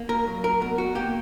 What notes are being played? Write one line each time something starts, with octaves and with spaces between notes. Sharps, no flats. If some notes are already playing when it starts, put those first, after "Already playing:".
Already playing: A#3
A#4
F#3
A#4
B2 A#4
F#4
A#3 G4